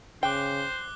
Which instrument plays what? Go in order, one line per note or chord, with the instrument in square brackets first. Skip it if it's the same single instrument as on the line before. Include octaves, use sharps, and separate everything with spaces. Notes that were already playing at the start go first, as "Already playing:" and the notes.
[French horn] C#3 [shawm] C5 [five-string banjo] G5 [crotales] D6 F#6 G7